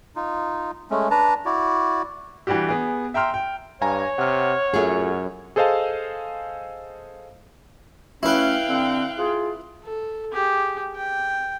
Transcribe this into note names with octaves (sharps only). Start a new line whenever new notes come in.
D#4 F4
G#3 A3 C#4
D4 B4 A5 A#5
E4 F#4 D5
E3 G3 D4 F#4 G4
B3 G#4
E5 G5 A#5 C6 F6
G5
G2 C#5 F5 G#5 A#5
C3 F#5 F6
F#2 A3 F4 G#4
G#4 A4 C5 D#5 F5 A5
F#3 A3 C#4 E4 B4 F5 G5 F#6
D3 C4
F4 G#4
A4
G4 G#4
G5